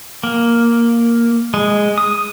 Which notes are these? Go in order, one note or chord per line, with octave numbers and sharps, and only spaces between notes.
A#3
G#3
D#6